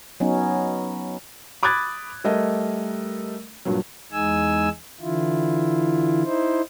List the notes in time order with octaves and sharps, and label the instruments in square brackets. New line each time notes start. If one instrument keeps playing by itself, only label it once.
[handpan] F#3 B3 C#4 D#4
[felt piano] B5 D6 D#6 F#6 G#6 A6
G3 A3 A#4 D#5
G2 A#2 F#3
[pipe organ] E2 G#3 D#4 G#5 E6
D3 E3 E4 F4
D#4 E4 C5